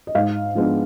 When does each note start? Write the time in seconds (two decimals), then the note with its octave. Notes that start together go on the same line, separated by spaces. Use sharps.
0.07 D#5
0.15 G#2 F5
0.55 F3 G#3 B3 D4